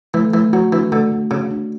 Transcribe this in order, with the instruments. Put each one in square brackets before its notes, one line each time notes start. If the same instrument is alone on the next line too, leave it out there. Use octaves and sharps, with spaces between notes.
[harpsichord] E3 [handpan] A3
[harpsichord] E3 [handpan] A3
[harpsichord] F#3 [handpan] F#4
[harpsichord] E3 [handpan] D4
[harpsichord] D3 [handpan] A3
[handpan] A3
[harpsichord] C#3 [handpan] F#4
[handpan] D4